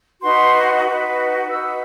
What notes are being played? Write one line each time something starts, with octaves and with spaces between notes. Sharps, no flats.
D#4 F#4 B4 C6
D#4 F#4 B4
D#4 F#4 B4 E6